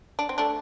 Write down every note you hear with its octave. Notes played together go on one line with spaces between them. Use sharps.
D4
C4
A3 D4